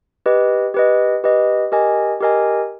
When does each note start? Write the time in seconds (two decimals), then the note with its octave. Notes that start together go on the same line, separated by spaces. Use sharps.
0.26 G4 B4 D#5
0.74 G4 B4 D#5
1.24 G4 B4 D#5
1.72 G4 A#4 D#5 G#5
2.20 G4 A#4 D#5 G#5